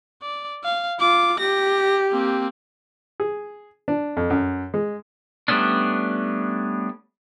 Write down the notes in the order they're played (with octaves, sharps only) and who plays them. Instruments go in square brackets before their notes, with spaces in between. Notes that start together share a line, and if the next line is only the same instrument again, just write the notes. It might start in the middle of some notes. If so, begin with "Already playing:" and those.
[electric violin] D5
F5
[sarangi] F4 [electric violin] D6
[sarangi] G4 [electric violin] A#6
[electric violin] A#3 C4
[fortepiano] G#4
D4
F2
F#2
G#3
[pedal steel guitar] G3 A3 B3 C#4 D4